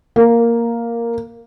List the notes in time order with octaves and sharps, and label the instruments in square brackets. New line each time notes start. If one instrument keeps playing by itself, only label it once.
[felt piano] A#3